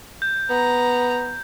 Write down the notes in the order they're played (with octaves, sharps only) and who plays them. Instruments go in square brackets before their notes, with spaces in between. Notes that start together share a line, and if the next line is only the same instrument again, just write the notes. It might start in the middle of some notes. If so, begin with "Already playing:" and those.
[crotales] G6
[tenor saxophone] B3 [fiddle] A#5